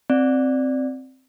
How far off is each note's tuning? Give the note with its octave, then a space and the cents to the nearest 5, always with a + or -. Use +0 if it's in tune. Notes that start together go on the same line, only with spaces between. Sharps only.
C4 +0 D5 +5